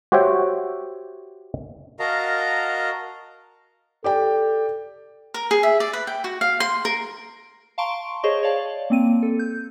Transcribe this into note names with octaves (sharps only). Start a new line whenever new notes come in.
F#4 G4 C5 C#5 E5 G5
F#4 A#4 D#5 F5 A5 A#5
G4 A4 D5 G5
A#4
G#4
E5
D5
B4
G5
F#4
F5
C6
A#4
F5 A5 A#5 C6 C#6 D7
G#4 C5 C#5 D#5 C#6
C#5 D5 F5 A5
A#3 C4 D#7
A4
G6